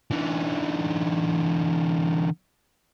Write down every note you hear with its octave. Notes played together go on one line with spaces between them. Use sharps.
D3 E3